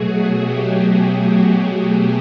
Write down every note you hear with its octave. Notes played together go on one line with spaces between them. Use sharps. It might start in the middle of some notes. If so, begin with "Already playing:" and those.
Already playing: B2 F#3 A3 F#4 G#4
G4